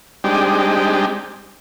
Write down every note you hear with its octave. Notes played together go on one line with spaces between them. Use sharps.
G3 G#3 C4 D4 D#4 G4